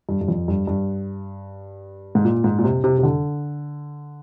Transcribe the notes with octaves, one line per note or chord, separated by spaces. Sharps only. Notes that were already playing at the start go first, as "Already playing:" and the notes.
G2
G2
F2
G2
G2
G#2
A#2
G#2
A#2
C3
C3
C3
D3